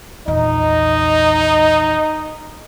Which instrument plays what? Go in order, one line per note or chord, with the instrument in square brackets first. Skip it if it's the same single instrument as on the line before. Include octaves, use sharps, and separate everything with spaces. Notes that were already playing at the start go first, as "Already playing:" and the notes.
[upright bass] A#1 E2 [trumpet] D#4 [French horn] D#5